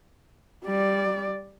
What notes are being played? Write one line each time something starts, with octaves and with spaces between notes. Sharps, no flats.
G3 D5